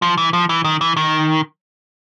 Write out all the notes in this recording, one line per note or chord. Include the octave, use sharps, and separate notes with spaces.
F3
E3
F3
E3
D#3
E3
D#3